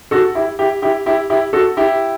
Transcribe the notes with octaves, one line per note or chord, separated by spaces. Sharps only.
F#4 A4
E4 G4
E4 G4
E4 G4
E4 G4
E4 G4
F#4 A4
E4 G4